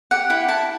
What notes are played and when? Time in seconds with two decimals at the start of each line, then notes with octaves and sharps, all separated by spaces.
0.11 G4 F#5
0.30 E4 G5
0.48 E4 A5